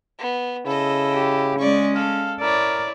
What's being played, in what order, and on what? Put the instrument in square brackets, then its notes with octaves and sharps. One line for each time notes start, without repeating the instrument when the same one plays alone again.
[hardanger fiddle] B3
[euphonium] C#3 [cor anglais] E4 [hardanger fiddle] A4 D#5
[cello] G4
[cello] G#3 C#4 [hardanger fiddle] D5 C#6
[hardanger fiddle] A4 [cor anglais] F5
[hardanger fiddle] E4 C#5 [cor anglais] A#4 [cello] D5